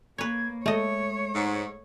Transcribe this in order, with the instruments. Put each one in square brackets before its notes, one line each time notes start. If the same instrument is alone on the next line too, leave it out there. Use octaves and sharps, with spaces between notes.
[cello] A#3 [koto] B4 C#5 [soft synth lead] G#6
[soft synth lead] G#3 [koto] A3 D#5 [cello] C#5
[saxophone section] G#2